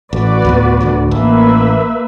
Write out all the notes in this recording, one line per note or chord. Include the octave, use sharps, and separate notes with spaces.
A1 F#4 B4 D5
D2 A2 B3
D1 D2 D3
A1 A#3 B4 E5